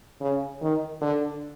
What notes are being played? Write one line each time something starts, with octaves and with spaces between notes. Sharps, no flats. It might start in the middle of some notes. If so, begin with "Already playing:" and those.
C#3
D#3
D3